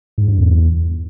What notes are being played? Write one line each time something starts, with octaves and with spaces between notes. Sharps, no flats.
G#2
G2
E2